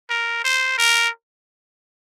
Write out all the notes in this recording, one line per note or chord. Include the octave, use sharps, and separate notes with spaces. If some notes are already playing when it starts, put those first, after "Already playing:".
A#4
C5
A#4